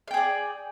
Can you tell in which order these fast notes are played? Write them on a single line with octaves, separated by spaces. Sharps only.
F5 G5 G#4 D5